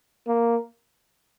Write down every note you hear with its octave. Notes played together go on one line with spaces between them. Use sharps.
A#3